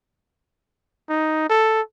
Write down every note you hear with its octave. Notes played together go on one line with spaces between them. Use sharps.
D#4
A4